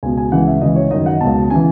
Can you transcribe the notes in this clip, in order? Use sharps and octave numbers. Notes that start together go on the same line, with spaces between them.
C#2 B2 G#5
G#5
C#2 C#3 E3 F#5
E5
C#2 C#3 E3 D#5
C#5
F#2 D#3 D#5
F#5
C#2 B2 A5
C#3 E3 G#5